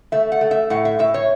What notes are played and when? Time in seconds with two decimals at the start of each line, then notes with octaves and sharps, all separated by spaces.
0.12 A3 E5
0.32 F#5
0.41 A3
0.51 E5
0.70 A2 F#5
0.85 E5
0.99 A2 E5
1.14 C#5